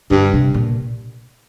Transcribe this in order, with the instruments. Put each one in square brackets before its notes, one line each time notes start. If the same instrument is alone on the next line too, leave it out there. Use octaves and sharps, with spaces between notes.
[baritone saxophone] G2 [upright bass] D3
[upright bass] C3
A#2